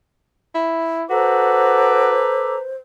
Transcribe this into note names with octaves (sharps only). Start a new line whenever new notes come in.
E4
F#4 A4 B4 C5 A#5 D6